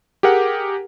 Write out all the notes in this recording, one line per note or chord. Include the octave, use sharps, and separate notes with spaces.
G4 G#4 A#4 F#5